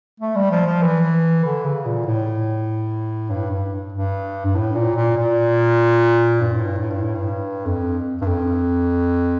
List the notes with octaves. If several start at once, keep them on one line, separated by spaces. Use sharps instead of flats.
A3
G3
F3
F3
E3
D3
C#3
A#2
A2
G2
G2
G2
G2
A2
A#2
A#2
A#2
G2
A2
G2
A2
G2
A2
G2
F2
G2
F2